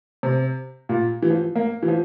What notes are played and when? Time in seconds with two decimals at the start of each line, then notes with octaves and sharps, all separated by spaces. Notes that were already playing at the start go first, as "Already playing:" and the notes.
0.23 C3
0.89 A#2
1.23 E3
1.30 F3
1.56 A#3
1.83 E3
1.88 F3